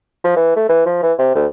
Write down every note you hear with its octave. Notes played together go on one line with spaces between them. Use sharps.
F3
E3
A3
E3
F3
E3
C3
D2